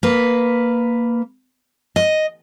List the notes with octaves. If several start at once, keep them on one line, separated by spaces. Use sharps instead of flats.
A#3 B4
D#5